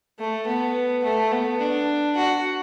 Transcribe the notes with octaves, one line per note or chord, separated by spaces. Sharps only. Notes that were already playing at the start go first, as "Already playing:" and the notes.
A3
B3
A3
B3
D4
F#4